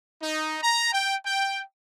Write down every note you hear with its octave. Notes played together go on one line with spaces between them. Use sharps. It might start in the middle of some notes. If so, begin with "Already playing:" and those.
D#4
A#5
G5
G5